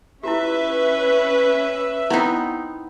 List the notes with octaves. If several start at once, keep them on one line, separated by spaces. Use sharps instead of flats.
C#4 E4 F4 G4 B4 E5
B3 C4 D#4 E4 C#6